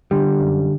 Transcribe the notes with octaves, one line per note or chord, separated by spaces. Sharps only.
D3 G3
F#2